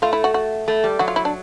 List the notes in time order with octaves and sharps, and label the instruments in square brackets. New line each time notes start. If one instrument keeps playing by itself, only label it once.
[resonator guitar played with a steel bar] A3 [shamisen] F4
[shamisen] E4
F#4
F#4
[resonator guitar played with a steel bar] A3
G3
[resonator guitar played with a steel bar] F#3 [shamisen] F#4
[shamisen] F4
E4
D4